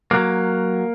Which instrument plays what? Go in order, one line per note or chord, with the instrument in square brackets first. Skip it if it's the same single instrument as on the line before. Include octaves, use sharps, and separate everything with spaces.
[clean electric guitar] F#3 A#3